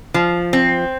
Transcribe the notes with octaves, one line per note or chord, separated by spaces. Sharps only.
F3
C4